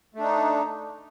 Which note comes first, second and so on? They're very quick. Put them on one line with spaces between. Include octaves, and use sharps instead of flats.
A3 D4 D#4